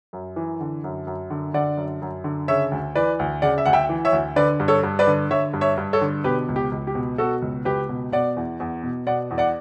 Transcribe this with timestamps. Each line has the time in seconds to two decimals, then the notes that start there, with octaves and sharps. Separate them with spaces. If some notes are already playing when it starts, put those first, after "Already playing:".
0.13 F#2
0.36 E3
0.61 D3
0.84 F#2
1.07 F#2
1.30 D3
1.54 D3 D5 F#5
1.77 F#2
2.02 F#2
2.24 D3
2.48 C#3 C#5 E5
2.72 D2
2.95 E3 B4 D5
3.19 D2
3.42 C#3 D5 F#5
3.58 E5
3.66 D2 F#5
3.73 E5 G5
3.89 E3
4.05 C#5 E5
4.12 D2
4.36 D3 B4 D5
4.60 G2
4.68 A4 C#5
4.83 G2
4.99 B4 D5
5.07 D3
5.30 D3 C#5 E5
5.53 G2
5.61 C#5 E5
5.78 G2
5.93 A4 C#5
6.01 D3
6.24 B2 G4 B4
6.48 C#2
6.56 G4
6.72 C#2
6.87 G4
6.95 B2
7.18 B2 F#4 A4
7.42 C#2
7.65 C#2 G4 B4
7.89 B2
8.12 B2 D5 F#5
8.37 E2
8.60 E2
8.83 B2
9.07 B2 D5 F#5
9.31 E2
9.38 D5 F#5